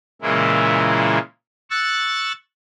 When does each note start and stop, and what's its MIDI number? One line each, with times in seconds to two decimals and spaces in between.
0.22 1.18 46
0.22 1.18 49
0.22 1.18 52
0.22 1.18 56
0.22 1.18 58
0.22 1.18 64
1.70 2.32 85
1.70 2.32 88
1.70 2.32 90
1.70 2.32 93